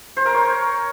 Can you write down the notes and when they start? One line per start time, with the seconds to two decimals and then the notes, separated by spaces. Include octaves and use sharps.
0.17 C5
0.25 A#4
0.34 C#5